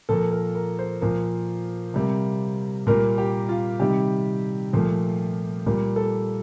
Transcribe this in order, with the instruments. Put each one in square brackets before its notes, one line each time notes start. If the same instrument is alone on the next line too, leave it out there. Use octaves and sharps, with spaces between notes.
[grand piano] A#2 F3 A#3 A4
A#4
A#4
C5
A#2 F3 A#3
C3 G3 A#3
A#2 G3 A#3 A#4
G4
F4
C3 D#3 G3 G4
A#2 F3 A3
A#2 G3 A#3
A4